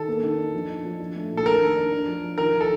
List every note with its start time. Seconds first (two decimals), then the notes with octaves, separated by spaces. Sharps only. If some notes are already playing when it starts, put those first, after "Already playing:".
Already playing: D#3 A4
0.08 A#3
0.23 D#3
0.38 D4
0.54 F3
0.70 D#4
0.85 F3
1.00 D4
1.16 A3
1.31 A#2
1.37 A4
1.45 D4 A#4
1.62 D#3
1.77 D4
1.91 D4
2.07 F3
2.23 F3
2.38 D#3 A#4
2.54 D#3
2.61 A4